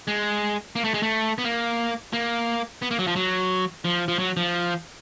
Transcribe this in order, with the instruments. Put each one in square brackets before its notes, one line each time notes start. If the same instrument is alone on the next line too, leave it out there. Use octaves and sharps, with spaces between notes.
[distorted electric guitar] G#3
A#3
A3
G#3
A3
B3
A#3
A#3
B3
A#3
F#3
F3
F#3
F3
F3
F#3
F3